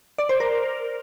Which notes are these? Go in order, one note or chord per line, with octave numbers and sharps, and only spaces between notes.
D5
C5
A#4